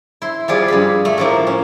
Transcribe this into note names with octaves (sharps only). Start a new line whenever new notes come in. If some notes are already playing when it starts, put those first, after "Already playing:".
E4 C6
F3 G3 F4 G#4 D5
G2 G#4 B5
A3
A2 F3 A#3
C#4